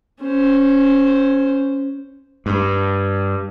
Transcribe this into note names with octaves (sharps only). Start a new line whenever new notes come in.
C#4 C5
G2